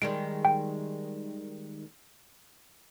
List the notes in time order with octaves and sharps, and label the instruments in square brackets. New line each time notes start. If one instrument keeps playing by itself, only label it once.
[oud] D#3 G3 G#3 [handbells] D7
[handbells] G5